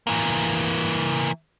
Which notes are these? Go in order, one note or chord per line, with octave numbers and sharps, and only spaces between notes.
E3 A#3